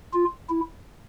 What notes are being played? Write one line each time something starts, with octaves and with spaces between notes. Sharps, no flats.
F4
E4